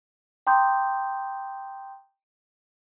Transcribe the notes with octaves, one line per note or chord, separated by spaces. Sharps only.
G5 A#5 C6 D6 D#6 G6